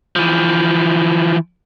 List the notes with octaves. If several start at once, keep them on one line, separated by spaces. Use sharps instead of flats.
E3 F3